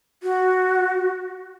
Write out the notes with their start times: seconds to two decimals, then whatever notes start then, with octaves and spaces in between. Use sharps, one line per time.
0.23 F#4